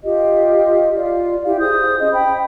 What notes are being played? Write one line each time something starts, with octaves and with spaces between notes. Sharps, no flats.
F4 G4 D#5
F4 D5
E4 G4 F5
G#4 C5 D#6 G6
C#4 C5 D#5
G5 B5